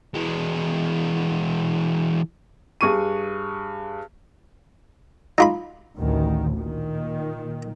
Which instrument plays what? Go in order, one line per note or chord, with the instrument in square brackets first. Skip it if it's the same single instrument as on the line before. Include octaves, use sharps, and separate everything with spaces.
[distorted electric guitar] E3 G#3
[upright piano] G2 G#4 C#6 D#7
[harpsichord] D#4 F4 B5
[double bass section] A1 D2 D#3
A#2 D#3